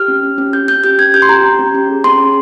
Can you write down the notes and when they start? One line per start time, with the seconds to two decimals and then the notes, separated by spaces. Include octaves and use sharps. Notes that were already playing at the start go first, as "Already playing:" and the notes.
Already playing: G4 F6
0.08 C#4
0.23 C#4
0.38 C#4
0.53 G4 G6
0.68 C#4 G6
0.84 G4 G6
0.99 C#4 G#6
1.14 G4 G6
1.22 C6
1.29 G4 A#5
1.44 C#4
1.59 C#4
1.74 C#4
1.89 G#4
2.04 C#4 C6
2.20 G#4